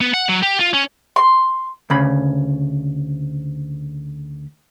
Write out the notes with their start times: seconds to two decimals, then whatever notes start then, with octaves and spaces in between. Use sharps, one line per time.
0.01 B3
0.14 F#5
0.29 F#3
0.43 G4
0.61 F4
0.74 C#4
1.16 C6
1.90 D2 C#3 B5